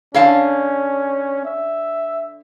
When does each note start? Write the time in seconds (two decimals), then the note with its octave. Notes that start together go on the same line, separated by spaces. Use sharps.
0.14 D3 C#4 F5 A5
1.45 E5